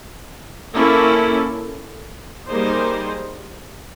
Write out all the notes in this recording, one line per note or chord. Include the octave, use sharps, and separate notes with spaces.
A#3 C#4 E4 A4
G3 A#3 D#4 G#4 C5